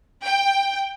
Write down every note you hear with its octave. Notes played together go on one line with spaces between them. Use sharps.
G5